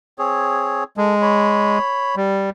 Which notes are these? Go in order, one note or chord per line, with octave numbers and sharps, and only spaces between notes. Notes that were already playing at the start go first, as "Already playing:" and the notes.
C4 G#4 C#5
G#3 A4
C#5 B5
G3